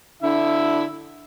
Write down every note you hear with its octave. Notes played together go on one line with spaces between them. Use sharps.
D3 E4 E5